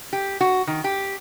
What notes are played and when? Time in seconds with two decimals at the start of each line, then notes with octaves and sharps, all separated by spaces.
0.13 G4
0.41 F#4
0.67 D#3
0.84 G4